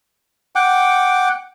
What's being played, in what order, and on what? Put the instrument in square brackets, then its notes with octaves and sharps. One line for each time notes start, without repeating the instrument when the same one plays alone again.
[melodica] F#5 G5 D6